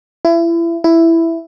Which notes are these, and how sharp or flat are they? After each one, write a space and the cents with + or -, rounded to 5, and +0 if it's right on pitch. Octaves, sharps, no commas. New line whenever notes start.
E4 +30
E4 +5